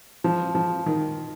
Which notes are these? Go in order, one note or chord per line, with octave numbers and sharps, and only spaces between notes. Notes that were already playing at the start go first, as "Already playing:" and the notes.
F3
F3
D#3